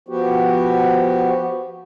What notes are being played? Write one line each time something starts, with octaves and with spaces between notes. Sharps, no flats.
F3 B3 F#4 G4